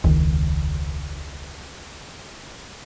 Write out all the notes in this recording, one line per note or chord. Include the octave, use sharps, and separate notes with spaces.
E1 C#2 D#3